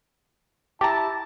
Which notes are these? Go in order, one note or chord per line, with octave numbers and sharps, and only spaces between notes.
E4 G4 A5 A#5